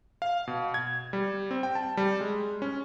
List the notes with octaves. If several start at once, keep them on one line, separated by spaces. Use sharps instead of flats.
F5
B2
G#6
G3
C4
G5
A5
G3
G#3
C#4